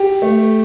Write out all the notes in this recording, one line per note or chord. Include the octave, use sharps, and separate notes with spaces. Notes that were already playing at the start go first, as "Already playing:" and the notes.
Already playing: G4
A3